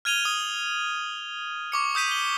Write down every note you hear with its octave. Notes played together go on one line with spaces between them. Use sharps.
F6 G#6 D#7 F7 G7
D#6
C#6 D6 C#7
D#6 G6 B6 D#7
G7